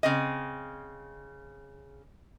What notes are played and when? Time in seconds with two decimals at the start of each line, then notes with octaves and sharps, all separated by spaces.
0.03 C#3 C4 D#5